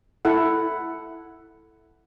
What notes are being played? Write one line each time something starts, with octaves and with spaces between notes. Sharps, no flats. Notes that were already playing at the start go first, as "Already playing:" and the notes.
E4 A4 F#5